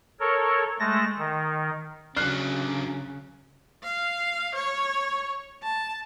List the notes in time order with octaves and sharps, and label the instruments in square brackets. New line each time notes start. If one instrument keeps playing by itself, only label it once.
[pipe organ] A4 A#4 C#5
G#3 A3 A5 A#6
D#3
[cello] C#3 [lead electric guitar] F#3 D4 [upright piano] F6 F#6 C7
[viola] F5
C#5
A5